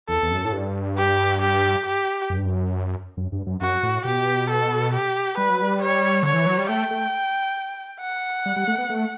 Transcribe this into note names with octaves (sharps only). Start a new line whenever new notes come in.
E2 A4
E2
F#2
A2
G2
G4
G4
G4
F#2
G2
F#2
F#2
G2
F#2
F#2 F#4
A2
B2 G4
A4
G4
G3 B4
F#3
G3
C#5
D3 C#5
E3
F#3
G3
A3 G5
A3
F#5
G3
G3
A3
B3
A3